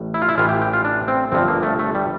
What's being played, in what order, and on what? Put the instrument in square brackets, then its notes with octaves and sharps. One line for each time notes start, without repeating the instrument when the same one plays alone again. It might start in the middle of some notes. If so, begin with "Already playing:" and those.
Already playing: [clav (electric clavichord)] A1 A2
E4
F4
E4
A1 A2 E3 F4
G4
G4
F4
D4
C4
G1 G2 D3 F3 C4
A#3
A3
A3
G3